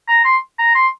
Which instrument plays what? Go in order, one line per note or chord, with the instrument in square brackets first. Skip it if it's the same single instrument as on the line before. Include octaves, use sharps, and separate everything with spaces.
[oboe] A#5
C6
A#5
C6